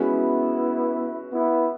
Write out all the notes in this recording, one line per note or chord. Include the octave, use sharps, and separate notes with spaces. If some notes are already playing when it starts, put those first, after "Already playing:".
Already playing: G#3 B3 C#4 E4 F#4 B4
B3 E4